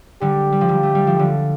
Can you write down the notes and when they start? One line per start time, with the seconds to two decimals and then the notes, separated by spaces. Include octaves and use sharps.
0.21 D3 G3 G4
0.52 G3
0.61 F3
0.69 D3 G3
0.83 A3
0.95 G3
1.07 F3
1.19 D3 G3